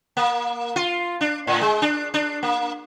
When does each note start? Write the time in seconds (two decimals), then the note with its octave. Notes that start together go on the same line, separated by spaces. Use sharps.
0.17 A#3
0.76 F4
1.21 D4
1.47 A2
1.61 G#3
1.82 D4
2.14 D4
2.43 A#3